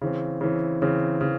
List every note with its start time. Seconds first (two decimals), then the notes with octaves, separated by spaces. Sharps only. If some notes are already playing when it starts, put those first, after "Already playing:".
0.02 C#3 E3 C4
0.41 C#3 E3 C4
0.82 C#3 E3 C4
1.21 C#3 E3